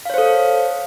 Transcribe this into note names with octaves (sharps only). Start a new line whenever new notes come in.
A4 C5 C#5 F5